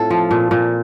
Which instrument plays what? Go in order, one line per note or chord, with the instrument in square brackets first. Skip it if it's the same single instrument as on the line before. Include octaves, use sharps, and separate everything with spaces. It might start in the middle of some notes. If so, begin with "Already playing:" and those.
Already playing: [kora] A2 C4 F4 A4
F3
A#2
A#2